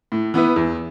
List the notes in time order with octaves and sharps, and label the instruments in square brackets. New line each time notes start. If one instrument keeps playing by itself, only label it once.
[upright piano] A2
E3 B3 E4 B4
E2